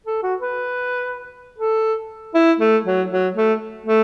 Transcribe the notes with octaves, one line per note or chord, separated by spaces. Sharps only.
A4
F#4
B4
A4
E4
A3
F#3
F#3
A3
A3